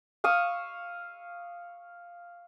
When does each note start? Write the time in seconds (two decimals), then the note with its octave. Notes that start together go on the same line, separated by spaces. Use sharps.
0.24 F5 C#6 D#6 E6